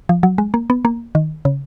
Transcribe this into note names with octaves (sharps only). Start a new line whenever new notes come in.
F3
F#3
G#3
A#3
B3
A#3
D#3
C#3